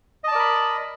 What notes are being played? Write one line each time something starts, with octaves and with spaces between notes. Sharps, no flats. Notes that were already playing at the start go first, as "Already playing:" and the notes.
A#4 D5 D#5 A5 B5